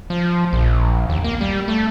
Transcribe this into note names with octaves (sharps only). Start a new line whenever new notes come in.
F3
A#1
D#2
A#3
G3
A3